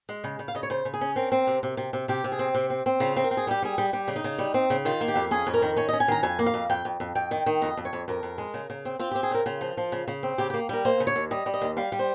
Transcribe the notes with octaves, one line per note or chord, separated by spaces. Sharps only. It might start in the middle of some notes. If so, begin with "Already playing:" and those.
G#3
C#3
C#3
F5
C#3 D#5
C#5
C#3 C5
C#3
G#4
C#4
C4 A#4
C4
C3
C3
C3
C3
C3 G4
C3
G#4
C4
C3
C4
C4
C#3 F4
C4
A#4
C4
G#4
G3 G4
G3 G#4
G3
G3 G4
C#3
D#4
C#3
G3
C4
C#3
D#3 F4
A#3
G4
F2
C#4 G#4
F2
A#4
D#3
C#4 C#5
D#5
C#4
G#5
D#3 A#5
F2 G#5
A#3
F5
F2
F2 G5
F2
F2
F2 G5
D#3
D#3
F2 D#5
F2
C#5
F2
F2 A#4
F2
G#3
C#3
C#3
C4
C4 F4
G4
C4
G#4
C#3 A#4
C#3 F4
F3
F3
C#3
C#3
C4
C#3 G4
G4
A#3
G3 A#4
A#3 C5
C#3
C#5
D#2
G3 D#5
G3
D#5
D#2
G3 F5
G3
C5